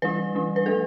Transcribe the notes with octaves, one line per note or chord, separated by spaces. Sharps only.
E3 G3 D4 B4
E3 G3 D4
B4
F3 A3 D4 A4